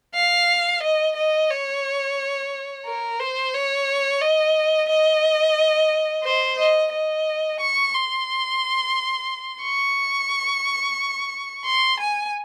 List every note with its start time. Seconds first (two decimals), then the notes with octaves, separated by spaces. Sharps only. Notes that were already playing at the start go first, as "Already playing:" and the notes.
0.15 F5
0.83 D#5
1.17 D#5
1.50 C#5
2.86 A#4
3.20 C5
3.54 C#5
4.21 D#5
4.89 D#5
6.24 C5
6.58 D#5
6.92 D#5
7.60 C#6
7.94 C6
9.62 C#6
11.65 C6
12.00 G#5